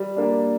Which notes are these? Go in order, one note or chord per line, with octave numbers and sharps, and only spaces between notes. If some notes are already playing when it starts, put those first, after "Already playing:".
Already playing: G3
A#3 D4